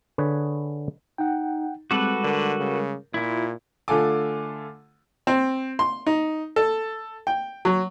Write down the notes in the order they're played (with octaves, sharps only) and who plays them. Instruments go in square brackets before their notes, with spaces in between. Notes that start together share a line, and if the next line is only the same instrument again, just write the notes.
[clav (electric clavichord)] D3 G#4 B4 C#5
[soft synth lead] D#4 [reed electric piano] F#5 G5
[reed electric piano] G3 G#3 D6 [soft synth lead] C4 [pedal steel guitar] F#4 A4 B4
[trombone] D3 [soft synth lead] A#4
[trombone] C#3
[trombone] A#2 [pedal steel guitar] E4 [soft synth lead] F4
[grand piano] D3 A3 F4 A4 G#5 D6
[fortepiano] C4
C6
D#4
A4
G5
F#3